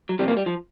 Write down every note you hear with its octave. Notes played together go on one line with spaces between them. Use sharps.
F#3
F2 C3 F3 G3
A#3
G3
F3